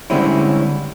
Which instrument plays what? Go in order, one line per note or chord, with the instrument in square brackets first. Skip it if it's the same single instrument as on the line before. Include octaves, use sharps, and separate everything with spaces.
[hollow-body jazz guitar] D3 G3 G#3 C4 C#4 E4